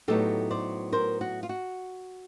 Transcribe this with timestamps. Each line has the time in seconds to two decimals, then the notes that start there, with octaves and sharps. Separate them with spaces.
0.08 A2 F#3 B3 D#4 G4 A4
0.51 C5 D5
0.92 A#4 C5
1.21 F#4
1.43 F4
1.49 F#4